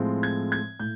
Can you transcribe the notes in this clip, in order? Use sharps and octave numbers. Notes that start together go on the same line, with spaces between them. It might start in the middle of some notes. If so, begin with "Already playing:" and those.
Already playing: A2 F3 G#3 C4
G#6
G#6
A2 G6